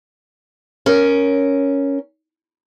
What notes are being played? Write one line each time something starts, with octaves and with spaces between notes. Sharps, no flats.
C#4 A#4